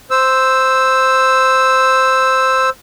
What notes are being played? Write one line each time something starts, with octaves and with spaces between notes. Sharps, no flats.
C5 E6